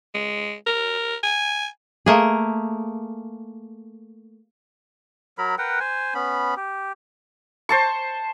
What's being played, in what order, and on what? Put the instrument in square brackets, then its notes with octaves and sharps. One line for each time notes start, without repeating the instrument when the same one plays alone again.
[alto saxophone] G#3
A#4
G#5
[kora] A3 A#3 G#4
[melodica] F#3 A#4 B5
A#4 B4 F#5 G5
C5 G#5
B3 C#4 B5
G4
[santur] C5 A5 C#6